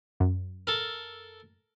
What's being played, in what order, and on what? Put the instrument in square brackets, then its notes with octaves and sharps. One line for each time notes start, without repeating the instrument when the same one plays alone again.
[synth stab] F#2
[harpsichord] A4 A#4